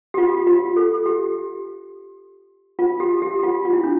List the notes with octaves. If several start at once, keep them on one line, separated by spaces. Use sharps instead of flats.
G4
F4
F4
A4
G4
F4
G4
G4
F4
F4
E4
D4